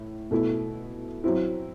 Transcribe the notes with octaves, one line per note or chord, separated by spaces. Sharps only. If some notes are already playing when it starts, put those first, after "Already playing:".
Already playing: A2
B2 A3 E4
F#3 C4 E4